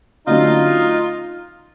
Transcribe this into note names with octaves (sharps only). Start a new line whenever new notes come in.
D3 F#3 A3 C#4 D#4 F4